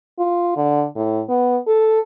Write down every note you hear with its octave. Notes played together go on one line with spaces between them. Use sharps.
F4
D3
A2
B3
A4